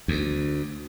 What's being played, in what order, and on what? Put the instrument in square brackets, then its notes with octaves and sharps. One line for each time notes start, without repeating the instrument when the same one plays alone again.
[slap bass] D2